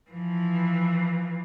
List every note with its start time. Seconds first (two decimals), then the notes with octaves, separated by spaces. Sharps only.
0.10 E3 F3